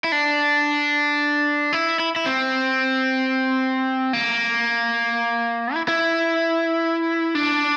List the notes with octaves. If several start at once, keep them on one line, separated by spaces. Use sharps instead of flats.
E4
D4
E4
E4
E4
C4
A#3
E4
E4
D4